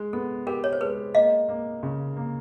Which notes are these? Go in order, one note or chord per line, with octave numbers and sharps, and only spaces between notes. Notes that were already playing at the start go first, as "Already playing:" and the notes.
Already playing: G#3
B3 A4
G4 A#4
C#5
C5
G#3 B4
A#3 D#5 F5
A#3
C#3
A#3